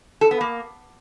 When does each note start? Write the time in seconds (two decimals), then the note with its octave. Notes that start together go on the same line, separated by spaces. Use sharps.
0.21 A4
0.31 B3
0.41 A#3